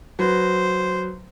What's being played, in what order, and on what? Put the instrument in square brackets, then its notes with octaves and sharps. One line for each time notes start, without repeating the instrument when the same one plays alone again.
[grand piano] F#3 B4 [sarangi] C5